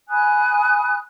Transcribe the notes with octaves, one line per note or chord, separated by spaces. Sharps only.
G#5 B5 D#6 F#6